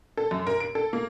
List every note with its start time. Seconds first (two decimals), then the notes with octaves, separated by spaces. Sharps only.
0.17 A4
0.31 F#2
0.47 A#4
0.60 D7
0.75 A4
0.93 A#3